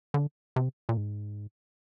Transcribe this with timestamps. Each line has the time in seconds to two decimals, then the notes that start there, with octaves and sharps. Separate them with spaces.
0.14 D3
0.56 C3
0.89 A#2
0.97 G#2